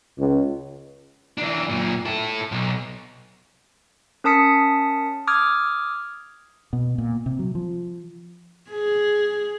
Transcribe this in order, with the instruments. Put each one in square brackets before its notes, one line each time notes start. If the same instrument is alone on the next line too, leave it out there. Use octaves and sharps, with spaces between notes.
[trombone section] C#2
[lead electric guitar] E3 D4
F#2 A#2
E4 A4
B1
[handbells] C#4 A#4 A5 D#6 B6 C#7
D6 D#6 F6 G#6
[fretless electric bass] B2
A#2
C3
F#3
F3
[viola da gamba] G#4